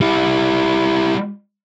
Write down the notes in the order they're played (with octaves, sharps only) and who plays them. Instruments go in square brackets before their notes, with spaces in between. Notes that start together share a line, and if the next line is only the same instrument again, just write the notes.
[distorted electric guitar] G3 E4